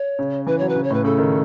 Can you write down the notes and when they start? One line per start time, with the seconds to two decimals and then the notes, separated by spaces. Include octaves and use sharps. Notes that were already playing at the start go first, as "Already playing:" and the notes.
Already playing: C#5
0.19 C#3
0.47 E3 B4
0.59 F#3 C#5
0.69 B4
0.75 C#3
0.84 C#5
0.90 A2 B4
1.04 C#3 A4
1.18 D#3